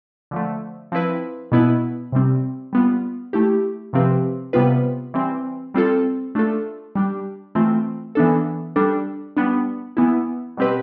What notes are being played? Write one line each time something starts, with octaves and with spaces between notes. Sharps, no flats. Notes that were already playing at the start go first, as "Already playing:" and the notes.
D3 F3 A3
F3 C4 E4 B4
B2 B3 E4 B4
C3 G3 C4
G3 B3 F4
A3 E4 G4
C3 F3 C4 G4 B4
C3 G3 B3 F4 B4
E3 G3 C4
G3 C4 F4 A4
A3 D4 F4 A4
G3 D4 G4
E3 A3 C4 F4
E3 B3 D4 A4
G3 D4 A4
G3 B3 D4
E3 B3 E4
B2 G3 C4 G4 B4